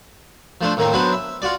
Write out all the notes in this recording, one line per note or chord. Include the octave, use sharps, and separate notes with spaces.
F3 A3 D4 C5
A2 D#3 A#3 C4
F#3 B3 D4 B4 C5
E5
F4 F#4 D5